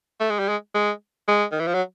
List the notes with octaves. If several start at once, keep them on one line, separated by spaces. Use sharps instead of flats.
A3
G#3
G3
G#3
G#3
G#3
D#3
E3
F3
F#3